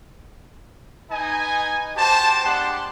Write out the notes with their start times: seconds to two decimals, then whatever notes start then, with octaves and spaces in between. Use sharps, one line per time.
1.11 D#4 B4 D#5 G#5
1.96 F#4 G4 C5 A5
2.44 G#3 B3 D4 G4 F#5 C6